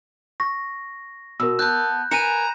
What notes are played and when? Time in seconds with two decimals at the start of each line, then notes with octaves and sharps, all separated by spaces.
0.40 C#6 A#6
1.40 B2 A#4 E6
1.59 B3 A5 F#6 G6
2.11 A#4 B4 G#5 A#5 C#7 D#7 E7